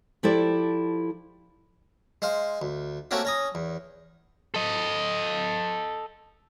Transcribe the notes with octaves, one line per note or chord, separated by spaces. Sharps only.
F3 E4 G4 A4 D5
G#3 C5 F5
D2
A3 A#3 C4 C#4 F#4 G4
C#4 A#5 D#6
E2
A4 D#5